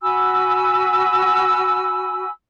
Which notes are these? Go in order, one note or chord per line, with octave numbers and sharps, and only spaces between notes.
F#4 G#5 B5 E6